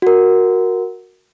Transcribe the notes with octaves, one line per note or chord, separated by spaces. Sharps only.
F#4 A#4